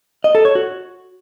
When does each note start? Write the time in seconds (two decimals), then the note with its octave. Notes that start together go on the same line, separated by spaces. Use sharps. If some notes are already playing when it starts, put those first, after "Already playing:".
0.24 D#5
0.35 A4
0.45 C#5
0.55 F#4